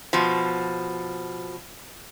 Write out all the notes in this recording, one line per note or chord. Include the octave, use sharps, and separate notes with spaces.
B2 F3